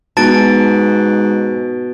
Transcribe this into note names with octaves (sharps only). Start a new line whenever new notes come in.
G#2 B2 A5 A6 D7